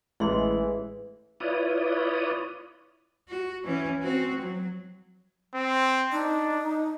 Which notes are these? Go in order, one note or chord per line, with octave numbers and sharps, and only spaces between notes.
A1 E3 G#3 E4 G#4 C6
E4 F4 B4 C#5 D5 D#6
F#4
E3 C#4
C4 F#4
F#3
C4
D4 D#4